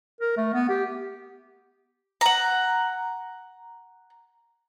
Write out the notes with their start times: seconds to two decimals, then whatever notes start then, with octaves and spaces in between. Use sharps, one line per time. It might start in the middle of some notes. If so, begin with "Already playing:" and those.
0.21 A#4
0.37 A3
0.54 B3
0.69 G4
2.21 F#5 A#5